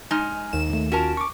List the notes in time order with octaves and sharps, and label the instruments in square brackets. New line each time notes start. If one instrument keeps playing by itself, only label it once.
[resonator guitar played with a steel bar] G#3 D#4 [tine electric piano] G#5 F6
[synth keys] D#2 E7
[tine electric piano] D#3 A3
[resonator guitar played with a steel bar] C#4 A#4 A5 [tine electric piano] F4 F#4
[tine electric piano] C#6 D6